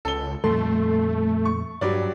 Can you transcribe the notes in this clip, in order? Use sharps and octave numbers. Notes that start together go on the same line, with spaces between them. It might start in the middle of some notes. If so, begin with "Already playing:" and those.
C#2 A4 G7
F2 A#2 G3 A3 A4 C6
C#6
G2 F#3 G3 D5